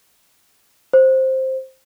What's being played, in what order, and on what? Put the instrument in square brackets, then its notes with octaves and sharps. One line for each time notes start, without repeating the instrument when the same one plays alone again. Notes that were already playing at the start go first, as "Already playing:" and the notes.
[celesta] C5